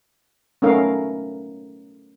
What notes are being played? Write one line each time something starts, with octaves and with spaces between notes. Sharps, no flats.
A3 B3 C#4 D#4 A#4 F5